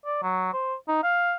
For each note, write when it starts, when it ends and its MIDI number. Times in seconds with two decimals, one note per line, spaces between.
0.06 0.20 74
0.23 0.51 54
0.53 0.74 72
0.88 1.03 63
1.03 1.36 77